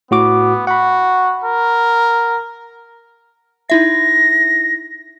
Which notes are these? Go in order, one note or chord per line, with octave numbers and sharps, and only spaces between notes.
A2 B3 F#4 D6
F#4 F#5 B5
A#4
D#4 E4 E5 A#6